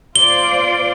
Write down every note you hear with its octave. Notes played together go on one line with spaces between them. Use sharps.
F4 C5 D5 G7